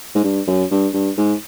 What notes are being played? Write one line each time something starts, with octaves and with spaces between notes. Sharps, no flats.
G#2
G2
F#2
G2
G2
G#2